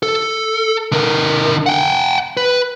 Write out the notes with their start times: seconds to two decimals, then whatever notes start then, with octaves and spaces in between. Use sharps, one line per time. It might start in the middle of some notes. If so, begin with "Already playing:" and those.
0.03 A4
0.92 D3 A#4
1.66 F#5 G5
2.37 B4